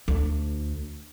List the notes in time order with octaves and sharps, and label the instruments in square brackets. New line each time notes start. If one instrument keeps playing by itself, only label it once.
[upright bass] D2